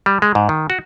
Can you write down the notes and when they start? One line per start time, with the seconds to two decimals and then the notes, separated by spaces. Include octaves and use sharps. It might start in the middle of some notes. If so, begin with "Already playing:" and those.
0.06 G3
0.22 G#3
0.35 G#2
0.49 D#3
0.70 F#4